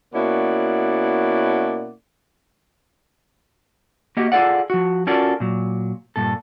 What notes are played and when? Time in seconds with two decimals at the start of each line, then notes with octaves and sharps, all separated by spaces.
0.13 B2 A#3 C#4 E4 D5 F#5
4.17 A#3 F#4 G4 D#5
4.32 F4 G#4 A4 D5 F#5
4.70 F3 F#4
5.07 C#4 F4 F#4 A4 A#4 D5
5.40 A#2 F#3
6.16 G2 A#2 A4